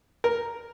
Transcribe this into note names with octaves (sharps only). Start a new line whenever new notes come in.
A#4